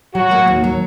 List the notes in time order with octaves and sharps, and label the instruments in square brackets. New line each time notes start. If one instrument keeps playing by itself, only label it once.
[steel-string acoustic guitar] F#3 [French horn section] F#4
[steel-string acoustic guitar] A#3
D#2
F#3